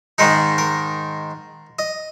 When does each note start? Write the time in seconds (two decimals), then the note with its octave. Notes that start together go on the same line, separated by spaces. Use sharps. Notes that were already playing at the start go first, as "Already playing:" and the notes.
0.18 G#2 D#3 G#3 D#4 A#4
0.58 A#4
1.79 D#5